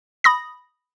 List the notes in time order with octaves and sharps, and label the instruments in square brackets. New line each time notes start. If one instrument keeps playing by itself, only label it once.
[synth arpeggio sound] B5 D#6 A#6